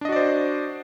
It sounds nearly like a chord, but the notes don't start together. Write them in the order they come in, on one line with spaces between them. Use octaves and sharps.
D4 D#5 F#4 D5 C5